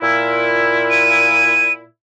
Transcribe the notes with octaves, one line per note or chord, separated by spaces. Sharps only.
A#2 E4
D#7